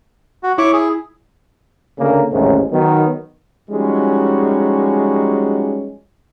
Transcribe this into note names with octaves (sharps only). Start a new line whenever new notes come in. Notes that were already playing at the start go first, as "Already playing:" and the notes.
F#4
E4 C#5 C#6 D6
G#4
D2 C#3 A#3
A1 D#2 G#2 C3 A3 C#4
D#3 F#3 B3
F3 G3 G#3 C#4 D#4 F#4